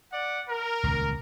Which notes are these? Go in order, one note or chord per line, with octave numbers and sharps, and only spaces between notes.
D5 F#5
A#4
D#1 C#2